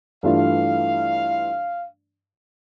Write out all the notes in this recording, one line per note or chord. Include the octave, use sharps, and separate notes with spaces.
G2 E3 A3 D4 F4 F5